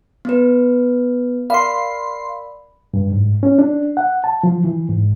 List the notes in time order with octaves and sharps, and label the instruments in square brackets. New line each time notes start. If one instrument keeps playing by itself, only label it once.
[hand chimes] B3 B4
[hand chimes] A#4 D5 B5 [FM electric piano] F5 C6
[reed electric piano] G2
G#2
C#4
D4
F#5
A5
F3
E3
G#2